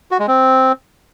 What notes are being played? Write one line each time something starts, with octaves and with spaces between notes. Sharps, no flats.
F#4
G#3
C4